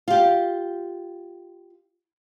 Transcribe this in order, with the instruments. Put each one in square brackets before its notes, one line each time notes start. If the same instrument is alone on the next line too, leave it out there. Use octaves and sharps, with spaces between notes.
[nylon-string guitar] F4 G4